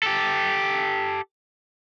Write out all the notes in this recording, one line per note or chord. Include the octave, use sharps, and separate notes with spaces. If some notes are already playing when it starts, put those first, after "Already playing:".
G4 A4